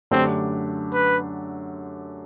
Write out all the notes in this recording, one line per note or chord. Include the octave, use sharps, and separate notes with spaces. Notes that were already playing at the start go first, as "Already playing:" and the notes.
F#2 D3 A3 C4 D4 G4
B4